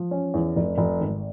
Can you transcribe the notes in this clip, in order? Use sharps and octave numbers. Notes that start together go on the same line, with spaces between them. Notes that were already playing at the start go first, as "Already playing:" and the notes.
Already playing: F3
C#4
E2
F1
F1
G#1